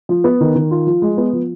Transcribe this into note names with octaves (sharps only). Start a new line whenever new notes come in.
F3
B3
D#3
D#3
F4
F3
G#3
B3
F3